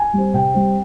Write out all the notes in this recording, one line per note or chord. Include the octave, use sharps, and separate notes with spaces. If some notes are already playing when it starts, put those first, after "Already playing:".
Already playing: G#5
G3
C4
C3 G5
G3 C4